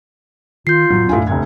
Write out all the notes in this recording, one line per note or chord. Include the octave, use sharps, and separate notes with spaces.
D#3 F4 G6 C7
F2 A2 F#3 B3
D#1 F#2 A2 D4 F5 G#5
F1 D2 G#6